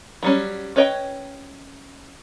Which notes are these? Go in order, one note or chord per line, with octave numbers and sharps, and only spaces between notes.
F#3 G3 C#4
C#4 B4 C#5 D#5 G5